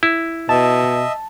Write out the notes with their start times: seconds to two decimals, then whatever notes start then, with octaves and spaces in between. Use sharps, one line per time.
0.03 E4
0.49 B2 D#5 E5 A5